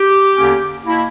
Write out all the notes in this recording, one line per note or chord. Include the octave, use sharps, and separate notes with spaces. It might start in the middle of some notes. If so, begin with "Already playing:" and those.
Already playing: G4
E2 D3 A#3 C#4
B2 A#3 E4